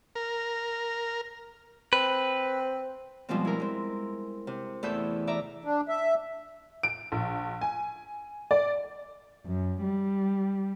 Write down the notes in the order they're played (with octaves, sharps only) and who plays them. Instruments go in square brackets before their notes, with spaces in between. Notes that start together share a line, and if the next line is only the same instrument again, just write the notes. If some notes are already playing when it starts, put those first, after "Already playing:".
[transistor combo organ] A#4
[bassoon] C4 [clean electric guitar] B4
[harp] B2 F3 G3 G#3 C4
E4 A#4
G#3 C4
C3
E2 E3 A3 A4 E6 G6
D5 E5 A#5
[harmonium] D4
E5
[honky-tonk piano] D7
A#1
G#5
D5
[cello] F#2
G3